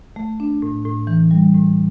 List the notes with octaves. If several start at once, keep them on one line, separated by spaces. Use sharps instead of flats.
A3
D4
A2
A2
E3
G3
A2